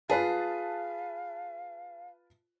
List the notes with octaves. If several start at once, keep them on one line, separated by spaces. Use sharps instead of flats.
F4 G#4 B4 F5 A5